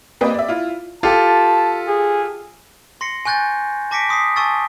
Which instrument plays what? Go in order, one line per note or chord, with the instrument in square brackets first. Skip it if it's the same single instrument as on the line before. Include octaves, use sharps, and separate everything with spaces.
[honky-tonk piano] A#3 C4 G4 B4 D5 D#5
D5 E5
E4 F4
[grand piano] F4 G4 A4 [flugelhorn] A5
[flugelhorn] G#4
[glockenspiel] C6 A#6 C7 C#7
G#5 C#6 F#6 G6 A6
A5 D6 A#6 B6 C#7 D7
C6 D#6 B6 C7
G#5 A5 C#6 E6 A6